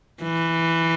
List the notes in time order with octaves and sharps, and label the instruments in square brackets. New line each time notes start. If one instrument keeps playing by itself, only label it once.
[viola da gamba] E3